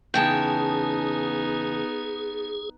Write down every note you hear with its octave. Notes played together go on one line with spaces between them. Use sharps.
E2 C#3 B3 D#4 G#4 G5 A5